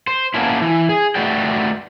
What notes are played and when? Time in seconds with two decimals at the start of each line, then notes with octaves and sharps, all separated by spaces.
0.07 C5
0.34 A#3 B3 C#4 D4 E4
0.62 E3
0.89 G#4
1.15 A3 F#4 B4 D5 G5